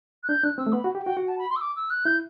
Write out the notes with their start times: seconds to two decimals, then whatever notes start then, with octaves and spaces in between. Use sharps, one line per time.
0.23 F#6
0.29 D4 G6
0.43 D4 F#6
0.58 C4 E6
0.67 A3
0.72 B3 B5
0.84 F#4
0.95 G4
0.98 F#5
1.02 F#4 G5
1.17 F#4 F#5
1.28 A5
1.39 B5
1.50 C6
1.56 E6
1.61 D6
1.76 E6
1.90 F#6
2.05 E4 G6